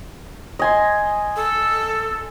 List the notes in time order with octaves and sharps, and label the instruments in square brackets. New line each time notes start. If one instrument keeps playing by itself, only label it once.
[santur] D#5 G#5 C6
[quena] A4